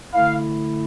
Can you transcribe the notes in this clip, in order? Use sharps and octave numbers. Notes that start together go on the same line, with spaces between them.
D3 A3 E4 F5